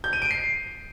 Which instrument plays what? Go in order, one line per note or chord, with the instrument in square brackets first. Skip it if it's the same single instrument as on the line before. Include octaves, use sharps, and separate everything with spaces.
[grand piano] G6
D#7
D7
C7